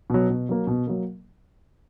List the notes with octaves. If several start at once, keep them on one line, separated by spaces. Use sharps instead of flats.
B2 F#3
B2
F#3 A#3
B2
F#3 A#3